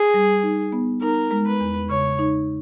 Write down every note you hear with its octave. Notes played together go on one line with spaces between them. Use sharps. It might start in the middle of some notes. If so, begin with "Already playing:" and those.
Already playing: G#4
G3
D#4
B3
D#4 A#4
G#3
B4
E2
C#3 C#5
D#4